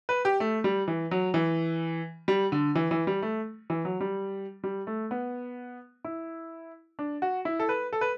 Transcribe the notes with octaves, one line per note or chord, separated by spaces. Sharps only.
B4
G4
A3
G3
E3
F#3
E3
G3
D3
E3
E3
G3
A3
E3
F#3
G3
G3
A3
B3
E4
D4
F#4
E4
A4
B4
A4
B4